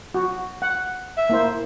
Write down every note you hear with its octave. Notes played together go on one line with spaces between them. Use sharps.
F#4
F#5
E5
A#3 E4 C5